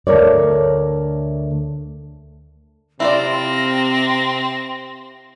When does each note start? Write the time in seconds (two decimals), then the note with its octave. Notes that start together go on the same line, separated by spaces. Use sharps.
0.07 D2 A3 A#4 C#5 D5
3.00 C3 C4 E4 F4 D5 A#6